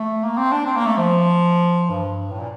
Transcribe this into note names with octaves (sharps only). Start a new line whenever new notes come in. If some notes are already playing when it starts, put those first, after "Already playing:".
Already playing: A3
A#3
C4
D4
C4
A#3
A3
F3
G2
A2
A#2